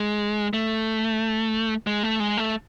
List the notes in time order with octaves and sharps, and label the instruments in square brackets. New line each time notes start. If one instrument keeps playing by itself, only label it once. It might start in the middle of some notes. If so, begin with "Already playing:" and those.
Already playing: [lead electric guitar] G#3
A3
G#3
A3
G#3
A3